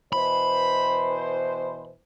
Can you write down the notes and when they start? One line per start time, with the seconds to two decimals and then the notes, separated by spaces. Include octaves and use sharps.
0.13 B2 E3 C5 B5